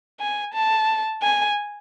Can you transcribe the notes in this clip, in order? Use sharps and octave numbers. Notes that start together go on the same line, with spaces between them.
G#5
A5
G#5